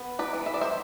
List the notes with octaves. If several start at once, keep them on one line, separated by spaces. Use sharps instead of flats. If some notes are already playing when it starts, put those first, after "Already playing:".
Already playing: B3
B4 D5
E3
E5
D5
C5 E5